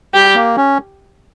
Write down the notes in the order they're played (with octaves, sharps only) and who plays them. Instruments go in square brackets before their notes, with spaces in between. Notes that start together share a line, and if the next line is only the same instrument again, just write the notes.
[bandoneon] G3 [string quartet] G4
[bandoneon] A#3
C#4